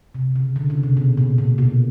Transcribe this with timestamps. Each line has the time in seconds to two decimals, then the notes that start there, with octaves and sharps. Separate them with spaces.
0.15 C3
0.36 C#3
0.56 D3
0.70 C#3
0.83 C3
0.97 B2
1.17 A#2
1.38 A#2
1.58 B2